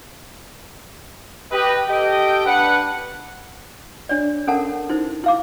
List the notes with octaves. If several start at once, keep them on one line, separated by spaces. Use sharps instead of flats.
G4 B4 D#5
G4 A4 D#5 G5
D4 B4 F#5
D4 C#5 D5
C#4 A4 A#4 F#5 A5
D#4 E4 C5
E4 F5 D6